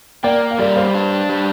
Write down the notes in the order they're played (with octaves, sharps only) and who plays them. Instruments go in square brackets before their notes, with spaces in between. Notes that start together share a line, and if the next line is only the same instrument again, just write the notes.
[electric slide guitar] A#3 [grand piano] D5 G5
[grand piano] F5
[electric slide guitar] G3 [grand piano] A#4 D5
[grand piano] C5 F5
[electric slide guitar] D4
G3